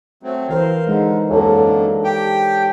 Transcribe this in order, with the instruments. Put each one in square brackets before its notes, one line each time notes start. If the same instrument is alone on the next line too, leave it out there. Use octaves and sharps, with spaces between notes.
[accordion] F#3 A3 C4
[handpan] E3 A#4 C5 [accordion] F5
[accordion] D3 [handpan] G#3 D#4
[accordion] F#2 D3 A#3 [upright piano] A4 C#5
[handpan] D4
[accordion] G4 G5